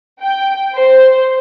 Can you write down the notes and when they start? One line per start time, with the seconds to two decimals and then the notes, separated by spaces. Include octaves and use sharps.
0.23 G5
0.75 C5